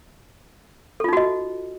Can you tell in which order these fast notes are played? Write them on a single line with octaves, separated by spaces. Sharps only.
A4 F4 D#4 F#4 D#5